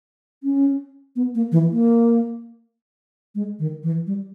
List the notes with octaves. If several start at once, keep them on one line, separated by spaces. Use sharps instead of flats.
C#4
B3
A#3
E3
A#3
G#3
D#3
E3
G3